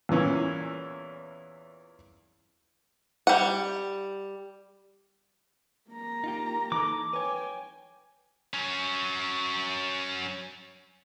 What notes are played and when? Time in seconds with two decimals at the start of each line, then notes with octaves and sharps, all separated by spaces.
0.09 E2 A#2 E3 C#4
3.27 G3 F#5
5.90 A#3 A#5
6.24 D#4 F4 G4
6.72 E3 D#4 A4 D6
7.13 B4 C#5 G5 G#5
8.54 F#3 C#4